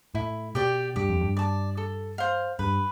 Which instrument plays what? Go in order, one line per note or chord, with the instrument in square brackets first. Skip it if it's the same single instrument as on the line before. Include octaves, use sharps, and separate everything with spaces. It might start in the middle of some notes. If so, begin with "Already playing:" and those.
[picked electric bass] A2 [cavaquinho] E4
[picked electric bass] B2 [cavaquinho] G4 D5 G5
[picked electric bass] G2 [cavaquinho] G4
[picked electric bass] F2
G2
[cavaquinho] D5 A5
A4
C5 F5
[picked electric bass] G2 [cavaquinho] B4